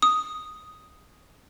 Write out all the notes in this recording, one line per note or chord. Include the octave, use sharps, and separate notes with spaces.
D#6